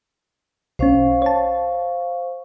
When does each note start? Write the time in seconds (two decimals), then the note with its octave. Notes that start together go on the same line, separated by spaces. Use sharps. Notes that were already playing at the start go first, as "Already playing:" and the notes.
0.79 B1 C#4 C5 F5 C#6
1.22 C#5 A5